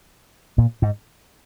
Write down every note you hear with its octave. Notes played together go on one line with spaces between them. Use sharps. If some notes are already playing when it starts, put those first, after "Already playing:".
A#2
G#2